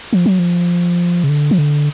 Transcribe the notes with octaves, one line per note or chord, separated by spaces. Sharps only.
F3
F#3
F3
C#3
D3
F3
D3